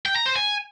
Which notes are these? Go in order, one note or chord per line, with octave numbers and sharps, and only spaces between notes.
G5
A#5
C5
G#5